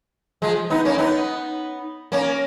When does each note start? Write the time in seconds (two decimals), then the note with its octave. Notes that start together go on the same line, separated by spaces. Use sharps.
0.42 F3 G#3
0.70 B3 D#4
0.85 A#3 C#4
0.98 B3 D#4
2.12 A#3 C#4